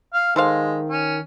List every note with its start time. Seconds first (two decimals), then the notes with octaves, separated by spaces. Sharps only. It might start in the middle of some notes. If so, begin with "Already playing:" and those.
0.13 F5
0.36 D#3 G#3 A4 C5 F5
0.89 C#4